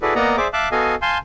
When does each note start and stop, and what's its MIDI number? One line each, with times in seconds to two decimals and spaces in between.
0.02 0.14 64
0.02 0.14 66
0.02 0.14 68
0.02 0.14 69
0.02 0.14 71
0.02 0.14 74
0.15 0.37 58
0.15 0.37 59
0.15 0.37 74
0.15 0.37 75
0.15 0.37 78
0.15 0.37 82
0.37 0.48 68
0.37 0.48 72
0.37 0.48 74
0.37 0.48 76
0.37 0.48 86
0.53 0.69 76
0.53 0.69 77
0.53 0.69 81
0.53 0.69 86
0.53 0.69 90
0.72 0.95 59
0.72 0.95 66
0.72 0.95 69
0.72 0.95 75
0.72 0.95 77
0.72 0.95 80
1.02 1.18 77
1.02 1.18 80
1.02 1.18 81
1.02 1.18 84
1.02 1.18 91